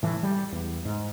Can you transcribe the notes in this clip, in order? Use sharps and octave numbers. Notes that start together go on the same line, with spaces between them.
A2 E3
G3
E2
G#2